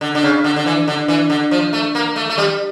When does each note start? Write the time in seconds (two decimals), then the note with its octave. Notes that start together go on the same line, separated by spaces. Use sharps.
0.01 D3
0.15 D3
0.23 C#3
0.44 D3
0.56 D3
0.66 E3
0.88 D3
1.08 E3
1.30 D3
1.51 F3
1.73 A3
1.95 A#3
2.16 A3
2.29 A3
2.38 G3